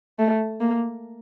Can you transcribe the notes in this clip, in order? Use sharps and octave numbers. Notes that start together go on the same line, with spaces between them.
A3
A#3